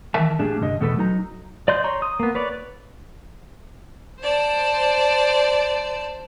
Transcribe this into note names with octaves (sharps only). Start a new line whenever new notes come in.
D#3 E3 A#4 E5 A5
A2 G3 A#3 D4 G#4 A5
C2 G2 D3 D#5
E2 B2 A3 B3 A4 B4
F#3 D#4 A#5
D5 D#5 C6 G6
C#5 A#5 C6
D#6
A#3 B3
B4 C#5 D5
C5 D5 A5